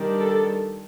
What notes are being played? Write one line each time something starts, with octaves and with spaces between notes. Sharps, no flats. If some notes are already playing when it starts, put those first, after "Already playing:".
Already playing: D#3 G3 D4
A4